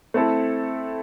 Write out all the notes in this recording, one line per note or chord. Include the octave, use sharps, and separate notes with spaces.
A3 C4 E4 A4